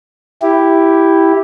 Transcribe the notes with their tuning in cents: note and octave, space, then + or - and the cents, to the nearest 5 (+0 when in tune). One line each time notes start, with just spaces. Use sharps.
E4 +0 G4 +0